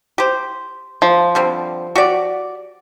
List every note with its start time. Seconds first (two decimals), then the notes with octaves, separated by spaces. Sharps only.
0.18 G4 C5
1.02 F3
1.35 D3 G3 C4
1.95 F#4 G4 D5